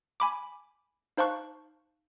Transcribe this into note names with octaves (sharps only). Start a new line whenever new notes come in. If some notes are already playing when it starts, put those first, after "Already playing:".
G#5 B5 D6
D#4 C5 F5 A5 C#6 F#6